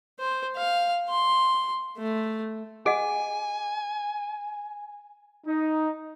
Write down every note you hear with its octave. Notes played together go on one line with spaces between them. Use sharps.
C5
F5
C6
A3
G#4 D#5 F#5 G#5
D#4